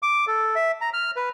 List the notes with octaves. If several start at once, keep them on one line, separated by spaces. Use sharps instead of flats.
D6
A4
E5
A#5
F6
B4